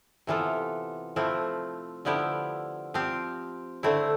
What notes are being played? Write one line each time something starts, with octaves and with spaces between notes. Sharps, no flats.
C3 E3 B3 F4 A4
F3 A3 C4 E4
D3 F3 B3 E4 G4
F3 C4 G4
D3 A3 C4 E4